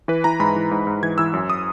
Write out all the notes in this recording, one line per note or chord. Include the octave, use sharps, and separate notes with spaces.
E3 B4
E3 A#5
G#2 B5
E3
G#2
G#2
E3 G#6
E3 E6
F#2
D#6